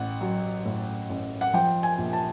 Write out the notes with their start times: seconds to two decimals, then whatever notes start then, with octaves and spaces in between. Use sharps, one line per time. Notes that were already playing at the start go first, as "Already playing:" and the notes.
Already playing: A1 F#5
0.21 F#3
0.65 A2
1.10 A1
1.41 F#5
1.53 F3 G5
1.83 G#5
1.98 A#1
2.13 A5